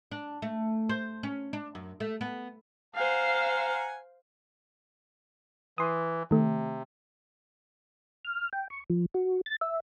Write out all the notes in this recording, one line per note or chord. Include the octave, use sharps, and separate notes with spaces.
D4
A3
C5
C#4
D4
F#2
A3
B3
C5 F5 F#5 G#5 A#5
E3 C6 D#6
C3 D#3 A3
F6
G5
C#6
F3
F#4
A6
E5